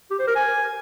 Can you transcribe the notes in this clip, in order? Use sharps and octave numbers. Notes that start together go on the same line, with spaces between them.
G4
C5
A#4
G#5